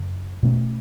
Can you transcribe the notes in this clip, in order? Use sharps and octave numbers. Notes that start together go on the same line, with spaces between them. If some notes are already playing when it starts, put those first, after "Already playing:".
Already playing: F#2 C#3
B2 A3 C#4